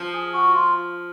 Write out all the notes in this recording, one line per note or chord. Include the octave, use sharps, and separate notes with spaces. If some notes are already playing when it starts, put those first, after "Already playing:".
Already playing: F3
G#4
F#4
F4